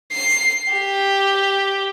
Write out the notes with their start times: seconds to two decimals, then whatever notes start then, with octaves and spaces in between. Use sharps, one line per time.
0.13 C7
0.72 G4